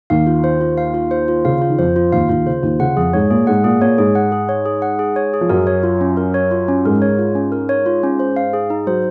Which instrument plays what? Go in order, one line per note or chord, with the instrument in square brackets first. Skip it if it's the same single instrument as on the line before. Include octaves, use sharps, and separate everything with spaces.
[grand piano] D#2 D#3 [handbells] F5
[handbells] F4
C5
F4
F5
F4
C5
F4
[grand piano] C#3 [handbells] F5
[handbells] F4
[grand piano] D#3
[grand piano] F2 F3 [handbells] C5
[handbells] F4
[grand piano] D#2 D#3 [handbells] F5
[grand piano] D#2 D#3 [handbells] F4
[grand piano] C#3 [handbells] C5
[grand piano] D#2 D#3 [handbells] F4
[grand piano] C#3 [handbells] F#5
[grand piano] F2 F3 [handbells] G#4
[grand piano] G#2 G#3 [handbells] C#5
[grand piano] A#2 A#3 [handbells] G#4
[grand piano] G#2 G#3 [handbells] F#5
[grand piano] A#2 A#3 [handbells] G#4
[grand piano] A#2 A#3 [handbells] C#5
[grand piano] G#2 G#3 [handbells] G#4
[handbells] F#5
G#4
C#5
G#4
F#5
G#4
C#5
G#4
[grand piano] F3
[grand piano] F#2 F#3 [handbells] A#4
[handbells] C#5
F4
C#4
A#4
C#5
F4
C#4
[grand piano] G#2 G#3 [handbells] A#4
[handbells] C#5
F4
C#4
A#4
C#5
F4
C#4
C5
F5
G#4
D#4
[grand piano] F#3 [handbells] C5